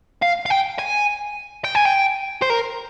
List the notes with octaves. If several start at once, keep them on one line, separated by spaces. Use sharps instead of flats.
F5
F5
G5
G#5
G5
G#5
G5
C5
A#4